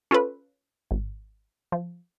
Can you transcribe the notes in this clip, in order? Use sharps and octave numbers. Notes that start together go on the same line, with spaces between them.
C#4 F4 A4 B4
G#1
F3